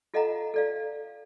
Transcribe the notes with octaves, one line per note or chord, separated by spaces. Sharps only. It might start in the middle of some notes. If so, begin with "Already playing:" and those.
F4 A4 D#5 F5 F#5 A#5
A4 D5 F5